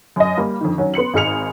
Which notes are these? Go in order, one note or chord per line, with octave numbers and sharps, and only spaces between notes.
F#2 D#5
G3 A#3
F2 D3 D#3
D#3 F#3 C#4 F#4
B3 C6 C#7 F#7
G#1 D#4 G#4 F6 C#7 F7